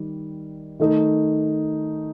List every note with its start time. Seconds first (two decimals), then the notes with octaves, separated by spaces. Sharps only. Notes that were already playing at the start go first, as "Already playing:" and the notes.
Already playing: D#3 G3
0.80 D#3 A3 D#4